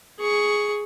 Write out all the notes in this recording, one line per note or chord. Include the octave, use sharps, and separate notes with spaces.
G#4 C#6